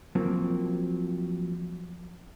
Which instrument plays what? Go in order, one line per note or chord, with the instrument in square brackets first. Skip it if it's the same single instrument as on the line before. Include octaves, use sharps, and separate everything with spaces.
[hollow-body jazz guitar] F3 F#3 A#3 C4